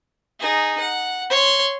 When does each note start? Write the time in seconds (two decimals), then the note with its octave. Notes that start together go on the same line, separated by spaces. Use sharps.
0.40 D#4 G#4
0.80 F#5
1.30 C#5 C6